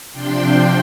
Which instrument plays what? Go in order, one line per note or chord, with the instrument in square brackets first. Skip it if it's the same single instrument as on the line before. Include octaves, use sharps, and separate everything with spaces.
[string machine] C3 F3 D4 G5 C6